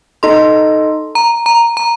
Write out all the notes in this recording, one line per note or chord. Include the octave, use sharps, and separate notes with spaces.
D#4 A4 D#5 C6
A#5
A#5
A#5